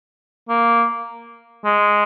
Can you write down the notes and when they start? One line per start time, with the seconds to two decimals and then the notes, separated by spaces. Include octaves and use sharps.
0.49 A#3
1.65 G#3